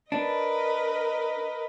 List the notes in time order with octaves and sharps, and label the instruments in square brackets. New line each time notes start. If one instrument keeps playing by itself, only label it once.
[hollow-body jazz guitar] D4 [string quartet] A#4 B4 D#5